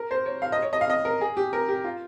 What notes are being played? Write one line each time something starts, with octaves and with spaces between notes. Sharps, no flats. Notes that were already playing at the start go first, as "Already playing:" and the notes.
Already playing: A#4
C5
C#5
F5
D#5
C#5
D#5
F5
D#5
A#4
G#4
G4
A#4
G4
F4